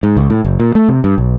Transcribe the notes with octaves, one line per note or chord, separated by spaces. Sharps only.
G#2
C#2
A2
F#1
A#2
A3
C3
G2
B1